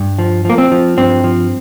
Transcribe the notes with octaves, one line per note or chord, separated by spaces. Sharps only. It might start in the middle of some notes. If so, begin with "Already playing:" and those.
Already playing: G2
F3
F3 A#3
C4
F3
G2 C4
F3